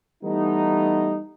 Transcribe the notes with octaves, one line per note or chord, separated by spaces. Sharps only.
E3 G3 A3 B3 D#4